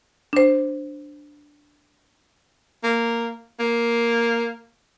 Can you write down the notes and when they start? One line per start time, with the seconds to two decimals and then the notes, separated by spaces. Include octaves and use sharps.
0.33 D4 C5
2.83 A#3
3.60 A#3